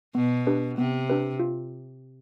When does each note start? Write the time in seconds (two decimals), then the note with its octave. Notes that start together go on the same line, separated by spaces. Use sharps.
0.15 B2 B3
0.47 D4 G4 B4
0.78 C3 B3
1.10 D4 G4 B4
1.40 F4